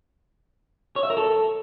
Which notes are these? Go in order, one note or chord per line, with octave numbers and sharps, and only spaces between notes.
C#5
E5
A#4
A4